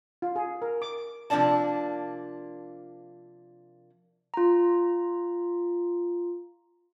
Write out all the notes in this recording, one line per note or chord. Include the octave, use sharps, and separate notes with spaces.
F4
G#4
A#4
D6
C3 F3 A#3 D4 D5 A5
F4 A#5